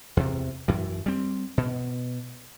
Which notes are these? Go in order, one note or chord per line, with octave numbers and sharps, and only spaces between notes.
E2 C3
F#2 E3
G3 C4
B2